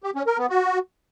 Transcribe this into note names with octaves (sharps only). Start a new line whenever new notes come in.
G4
C#4
A#4
B3
F#4